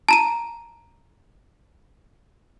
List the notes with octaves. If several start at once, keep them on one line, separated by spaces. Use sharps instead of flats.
A5 A#5 D#7